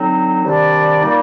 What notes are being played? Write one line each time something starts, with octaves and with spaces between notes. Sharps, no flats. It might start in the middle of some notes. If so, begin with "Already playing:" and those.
Already playing: D3 F#3 C4 D#4
C3 D#3 G3 D4 D5
A#2 G3 A#3 D#4